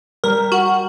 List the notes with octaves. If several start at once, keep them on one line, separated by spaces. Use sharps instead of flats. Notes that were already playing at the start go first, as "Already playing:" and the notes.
G3 A#4
F#4